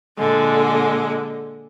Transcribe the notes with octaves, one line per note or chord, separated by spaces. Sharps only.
A#2 D3 G#3